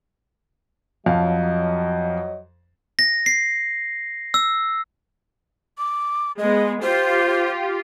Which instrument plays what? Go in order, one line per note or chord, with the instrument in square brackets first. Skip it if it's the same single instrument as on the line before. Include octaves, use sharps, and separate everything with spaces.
[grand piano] F2 F5 A5 [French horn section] F#3 D#5
[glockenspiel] A#6
C7
E6
[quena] D6
[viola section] G#3 B3 [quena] D#5
[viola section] F4 G4 [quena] C5